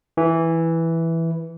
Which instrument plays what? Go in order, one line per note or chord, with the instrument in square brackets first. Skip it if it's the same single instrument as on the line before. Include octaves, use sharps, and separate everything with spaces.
[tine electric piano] E3